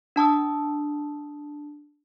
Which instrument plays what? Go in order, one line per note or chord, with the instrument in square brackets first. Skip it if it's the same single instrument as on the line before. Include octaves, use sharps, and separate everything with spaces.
[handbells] D4 A5 D#6 E6